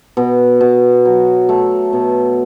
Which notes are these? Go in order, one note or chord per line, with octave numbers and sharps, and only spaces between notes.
B2
B2
F#3
A3
B2